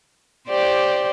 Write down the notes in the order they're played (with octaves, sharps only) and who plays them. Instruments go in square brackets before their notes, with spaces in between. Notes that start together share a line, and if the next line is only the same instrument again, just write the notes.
[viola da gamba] G4 C5 D5